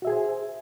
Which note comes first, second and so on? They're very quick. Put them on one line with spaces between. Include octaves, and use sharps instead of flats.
F#4 E5 G#4 G#5 C5